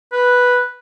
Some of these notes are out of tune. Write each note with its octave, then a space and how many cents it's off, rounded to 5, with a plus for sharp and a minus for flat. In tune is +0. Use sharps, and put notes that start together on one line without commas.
B4 -5